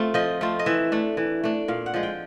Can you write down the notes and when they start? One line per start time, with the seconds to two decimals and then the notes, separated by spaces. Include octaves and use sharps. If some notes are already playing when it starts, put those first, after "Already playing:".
Already playing: A3 C4 F4
0.14 F3 D#5
0.41 A3 C4 F4
0.59 D#5
0.66 E3 E5
0.92 A3 D4
1.17 E3
1.43 A3 D4
1.68 A#2 F5
1.86 F#5
1.94 F3 G#3
2.03 G5